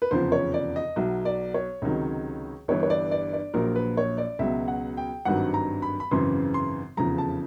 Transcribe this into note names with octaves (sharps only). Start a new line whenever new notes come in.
B4
F1 E2 C#3 F3 C5
C#5
D5
D#5
B1 B2 F#3 E5
D5
C#5
C#2 C3 D#3 F#3
G1 G2 E3 C#5
C#5
D5
D5
D5
A#1 A#2 F#3 A#4
B4
C#5
D5
C#2 B2 F#3 E5
F#5
G5
G#1 G2 D#3 F#3 F#5
A#5
B5
B5
G#1 F#2 C#3 E3 C6
C6
F1 E2 C#3 F3 A#5
A5